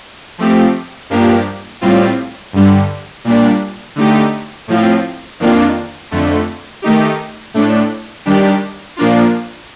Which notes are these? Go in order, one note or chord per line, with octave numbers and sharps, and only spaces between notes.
F3 A3 C4 G4
G2 F3 A#3 D4 G4
A2 G3 C4 F4
G2 D3 G3
A#2 G3 D4
D3 A3 D#4 G4
A2 F3 C4 F4
F2 D#3 A#3 D4 F4
F2 D3 A3
D#3 A3 D#4 G4
A2 A3 D4
D#3 G3 D4 G4
A#2 F3 A#3 D4 F4